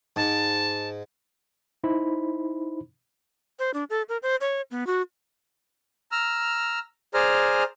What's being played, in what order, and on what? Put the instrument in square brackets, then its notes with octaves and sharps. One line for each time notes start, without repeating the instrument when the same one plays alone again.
[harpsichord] G#2 [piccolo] A5
[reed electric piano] D#4 E4 C5 B5
[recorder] C5
D4
A4
A#4
C5
C#5
B3
F#4
[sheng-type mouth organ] A#5 E6 F6
G#4 C5 D5 G#5 A#5 F6